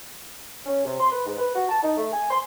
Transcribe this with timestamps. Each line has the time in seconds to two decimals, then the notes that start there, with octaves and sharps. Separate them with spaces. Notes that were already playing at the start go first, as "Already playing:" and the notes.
0.66 C#4
0.85 C3
1.00 C6
1.12 B4
1.26 G#2
1.39 B4
1.55 F#4
1.69 A5
1.83 D#4
1.97 A3
2.13 G#5
2.31 C6